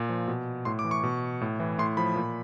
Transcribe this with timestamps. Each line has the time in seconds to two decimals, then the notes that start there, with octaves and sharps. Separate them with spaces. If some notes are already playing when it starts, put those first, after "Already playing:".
Already playing: A#2
0.09 F3
0.28 B2
0.65 A2 C6
0.79 D6
0.84 E3
0.91 C#6
1.03 B2
1.41 A2
1.60 E3
1.78 A2 C6
1.97 F3 B5
2.16 A#2